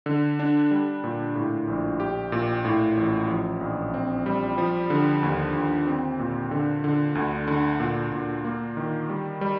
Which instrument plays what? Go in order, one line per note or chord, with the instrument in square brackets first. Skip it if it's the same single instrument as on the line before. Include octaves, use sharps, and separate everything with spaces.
[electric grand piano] D3
D4
G3
A#2
A2
A#1
G4
A#2
A2
A1
F3
A#1
C4
G3
F3
D3
D#2
D#2
C4
A#2
D3
D3
D2
D3
A#2
A#2
A#3
D#3
G3
G3